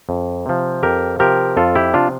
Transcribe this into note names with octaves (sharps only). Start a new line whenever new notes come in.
F2
C3 F3
F2 G4 A#4
C3 F3 G4 A#4
F2 F4 A4
E4 G4
C3 F3 D4 F4